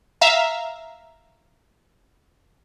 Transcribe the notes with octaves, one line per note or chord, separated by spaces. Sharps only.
E5 F5 A#5